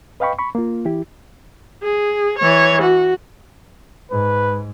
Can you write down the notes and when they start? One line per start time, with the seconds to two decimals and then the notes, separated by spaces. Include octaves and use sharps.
0.20 B4 D#5 F5 G5 B5 C#6
0.38 B5 C#6
0.55 A#3 F4
0.85 E3 E4 G4
1.82 G#4
2.38 E3 C#5
2.82 F#4
4.12 G#2 B4